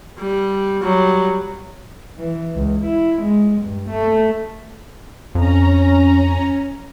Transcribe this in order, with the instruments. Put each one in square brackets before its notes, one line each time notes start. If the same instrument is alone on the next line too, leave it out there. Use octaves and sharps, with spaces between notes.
[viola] G3
F#3 G3
[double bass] E3
C#2
E4
G#3
G2
A3
[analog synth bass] F2 [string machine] C#4 A#5